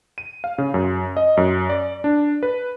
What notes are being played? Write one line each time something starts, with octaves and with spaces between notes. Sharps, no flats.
D#7
F5
C#3
F#2
D#5
F#2
D5
D4
B4